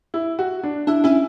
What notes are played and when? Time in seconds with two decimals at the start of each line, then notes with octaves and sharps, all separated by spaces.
0.14 E4
0.39 F#4
0.63 D4
0.87 D4 E4
1.04 C#4 E4